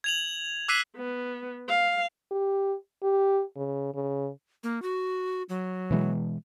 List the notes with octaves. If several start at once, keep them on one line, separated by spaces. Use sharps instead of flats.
G#6 F7 F#7
D6 E6 F#6 B6 C7 D#7
B3
F5
G4
G4
C#3
C#3
A#3
F#4
F#3
B2 E3 G#3